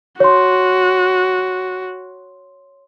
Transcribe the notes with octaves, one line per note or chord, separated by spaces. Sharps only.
F#4 C#5 C6